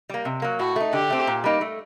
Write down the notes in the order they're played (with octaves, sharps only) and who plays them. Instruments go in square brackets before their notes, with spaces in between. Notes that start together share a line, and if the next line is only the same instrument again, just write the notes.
[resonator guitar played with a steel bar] G3 A#3
C3
F#3 A#3
[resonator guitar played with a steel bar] A2 [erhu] F#4
[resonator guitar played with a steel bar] A3 D#4
[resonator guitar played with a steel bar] D3 [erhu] G4
[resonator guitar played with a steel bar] A3 C4
A#2
G3 A#3 D#4 G4
A3